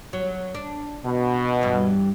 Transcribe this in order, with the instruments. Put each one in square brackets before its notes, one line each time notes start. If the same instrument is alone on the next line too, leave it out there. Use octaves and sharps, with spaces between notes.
[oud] F#3
D4
[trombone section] B2
[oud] G2 E3